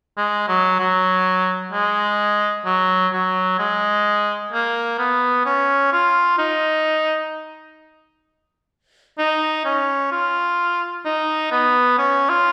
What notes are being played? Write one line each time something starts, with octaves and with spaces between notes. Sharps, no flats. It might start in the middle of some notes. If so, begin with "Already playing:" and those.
G#3
F#3
F#3
G#3
F#3
F#3
G#3
A#3
B3
C#4
F4
D#4
D#4
C#4
F4
D#4
B3
C#4
F4